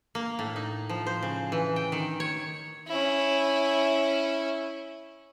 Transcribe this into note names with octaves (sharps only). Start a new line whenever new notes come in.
A#3
A2
D#4
F3
C5
C#3
E3
G5
D#3
C#5
C#4 E4